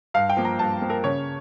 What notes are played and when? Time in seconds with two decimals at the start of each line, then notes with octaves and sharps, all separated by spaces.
0.14 G2 F5
0.30 G5
0.37 F3 A#3
0.45 A#5
0.59 G2 A5
0.82 F3 A#3
0.90 A#4
1.04 C#3 C#5